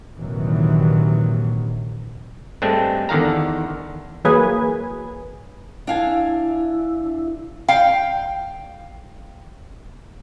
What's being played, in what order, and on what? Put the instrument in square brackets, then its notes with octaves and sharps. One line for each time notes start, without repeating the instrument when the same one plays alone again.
[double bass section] A#1 D#2 C3 D#3 E3 F#3
[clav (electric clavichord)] G2 G#3 A3 C4 D4
E2 D3 D#3 F5 A#5
[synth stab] E3 F#3 A#3 G#4 B4 G#5
[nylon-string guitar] D4 F5 G#5 [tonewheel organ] E4
[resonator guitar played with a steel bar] F5 G5